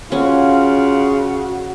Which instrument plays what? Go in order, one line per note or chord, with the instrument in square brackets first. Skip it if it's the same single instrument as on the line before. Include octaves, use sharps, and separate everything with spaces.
[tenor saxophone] C#3 [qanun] C#4 [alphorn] F4 [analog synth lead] F#4